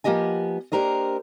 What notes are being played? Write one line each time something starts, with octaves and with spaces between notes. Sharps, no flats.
F3 A#3 B3 G4 D#5 G#5
A#3 D4 G4 A#4 C5 D#5